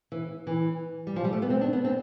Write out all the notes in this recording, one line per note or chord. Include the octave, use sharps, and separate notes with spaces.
E3
E3
G3
F3
G3
A3
B3
C4
D4
B3
C4